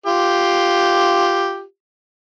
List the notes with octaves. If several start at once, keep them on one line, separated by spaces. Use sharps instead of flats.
F4 G4